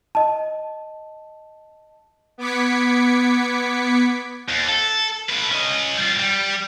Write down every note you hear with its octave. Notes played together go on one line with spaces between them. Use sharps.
D#5 A5
B3 D6 G#6 B6 C#7
D#2
A4
A3 B4
C#4 D#5
G3 F4
G3